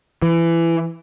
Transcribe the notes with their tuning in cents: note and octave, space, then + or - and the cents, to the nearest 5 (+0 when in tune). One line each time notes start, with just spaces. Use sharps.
E3 +20